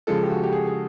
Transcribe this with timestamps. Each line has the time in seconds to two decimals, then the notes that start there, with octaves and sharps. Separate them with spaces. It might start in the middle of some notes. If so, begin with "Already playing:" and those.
0.07 C#3 F3 G#3 A4
0.23 G4
0.31 F#4
0.43 G4
0.53 G#4
0.67 G#4